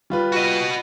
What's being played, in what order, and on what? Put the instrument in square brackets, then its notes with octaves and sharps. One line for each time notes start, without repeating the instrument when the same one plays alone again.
[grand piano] G3 F4 B4
[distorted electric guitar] F#4 D#5